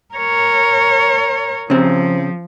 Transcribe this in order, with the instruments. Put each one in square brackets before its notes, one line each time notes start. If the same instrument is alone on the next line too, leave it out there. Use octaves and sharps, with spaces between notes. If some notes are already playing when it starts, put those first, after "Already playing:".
[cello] A#4 C#5
[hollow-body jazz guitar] C#3 C4 [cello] F3